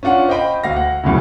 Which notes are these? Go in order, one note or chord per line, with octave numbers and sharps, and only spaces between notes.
C#4 D4 F4 F#5
C5 D#5 F5 G5 B5
D2 F5 A#6
F#5
B1 E2 A2 C#3